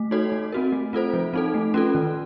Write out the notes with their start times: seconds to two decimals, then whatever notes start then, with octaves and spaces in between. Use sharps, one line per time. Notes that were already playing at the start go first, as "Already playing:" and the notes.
Already playing: A3
0.11 D#4 F#4 A4 C#5
0.32 A3
0.52 C4 F#4 A#4
0.72 A3
0.93 C4 F4 A4 C5
1.13 F3
1.33 C4 D#4 A4
1.54 A3
1.74 C#4 F4 A4
1.95 D#3